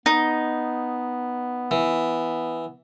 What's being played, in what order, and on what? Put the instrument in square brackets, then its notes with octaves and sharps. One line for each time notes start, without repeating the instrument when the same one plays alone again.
[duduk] B3 [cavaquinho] D#4
[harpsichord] E3